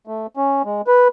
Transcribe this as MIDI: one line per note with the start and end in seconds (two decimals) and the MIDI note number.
0.07 0.27 57
0.37 0.62 61
0.65 0.82 56
0.87 1.08 71